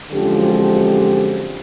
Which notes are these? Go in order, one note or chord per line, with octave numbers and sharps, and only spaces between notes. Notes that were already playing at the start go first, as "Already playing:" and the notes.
F#2 D3 F3 G#3 C4 G4
G4